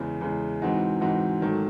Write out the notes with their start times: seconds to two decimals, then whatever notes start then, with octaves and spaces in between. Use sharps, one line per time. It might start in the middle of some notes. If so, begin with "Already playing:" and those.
Already playing: E2 C#3 G#3
0.21 E2 C#3 G#3
0.62 G#2 E3 C4 D#4 F#4
1.01 G#2 E3 C4 D#4 F#4
1.42 G#1 G#2 D#3 F#3 A3